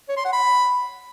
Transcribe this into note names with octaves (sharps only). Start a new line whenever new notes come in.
C#5
C6
F#5
B5